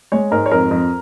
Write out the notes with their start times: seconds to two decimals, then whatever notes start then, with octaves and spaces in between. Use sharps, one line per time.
0.12 G#3 C#5
0.31 G#2 A#4
0.46 C#5
0.51 F2 A#4
0.71 F2